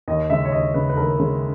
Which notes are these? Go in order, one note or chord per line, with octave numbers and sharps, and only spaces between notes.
D#2 D#5
C#3 G#3 E5
C#5
D#2 D#5
C#3 G#3 B4
B4
D#2 A#4
C#3 G#3